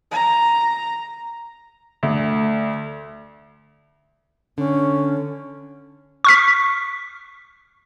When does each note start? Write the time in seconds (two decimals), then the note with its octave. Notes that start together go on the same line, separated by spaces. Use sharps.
0.11 A#5
2.03 D2
4.58 D3 C#4
6.24 C#6 F6 B6